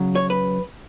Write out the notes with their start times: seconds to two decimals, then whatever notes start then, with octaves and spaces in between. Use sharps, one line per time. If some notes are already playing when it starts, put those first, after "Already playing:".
Already playing: C#3 F#3
0.15 C#5
0.30 B4